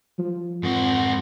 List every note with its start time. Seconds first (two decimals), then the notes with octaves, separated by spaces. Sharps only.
0.19 F3
0.63 F2 G#2 F#4